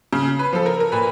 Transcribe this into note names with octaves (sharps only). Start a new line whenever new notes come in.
C#3
B4
F3 A4
A#4
A#4
A#2 B4